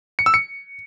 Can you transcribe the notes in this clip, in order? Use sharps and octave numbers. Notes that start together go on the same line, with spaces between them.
C#7
E6
C#7